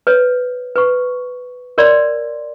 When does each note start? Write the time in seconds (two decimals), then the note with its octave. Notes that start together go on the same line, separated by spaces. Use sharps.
0.07 B4 C#5
0.75 B4 C#6
1.78 A#4 C#5 D5 C6